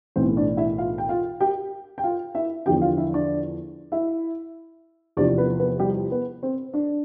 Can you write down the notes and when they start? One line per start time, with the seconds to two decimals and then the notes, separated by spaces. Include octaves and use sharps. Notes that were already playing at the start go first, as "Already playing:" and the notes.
0.16 B1 A2 E3 C4 C5
0.37 D4 D5
0.57 E4 E5
0.78 F4 F5
0.98 G5
1.09 F4 F5
1.40 G4 G5
1.98 G5
2.03 F4 F5
2.35 E4 E5
2.66 E2 D3 F3 G4 G5
2.82 F4 F5
2.97 E4 E5
3.14 D4 D5
3.92 E4 E5
5.17 E2 C3 F3 D4 D5
5.38 B3 B4
5.59 B3 B4
5.80 G3 G4
6.11 B3 B4
6.43 C4 C5
6.74 D4 D5